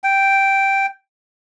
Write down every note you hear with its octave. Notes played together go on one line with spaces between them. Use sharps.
G5